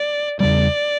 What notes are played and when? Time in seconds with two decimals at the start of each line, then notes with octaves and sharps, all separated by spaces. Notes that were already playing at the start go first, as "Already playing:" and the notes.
Already playing: D5
0.40 E2 C#3 G3 D5